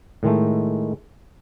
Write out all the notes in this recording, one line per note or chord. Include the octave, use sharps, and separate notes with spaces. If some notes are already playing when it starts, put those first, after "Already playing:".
A2 D#3 G#3 A3